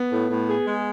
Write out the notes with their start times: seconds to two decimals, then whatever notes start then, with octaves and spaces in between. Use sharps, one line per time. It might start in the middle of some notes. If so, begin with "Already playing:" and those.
Already playing: B3
0.12 A2
0.30 A2
0.49 G#4
0.66 G#3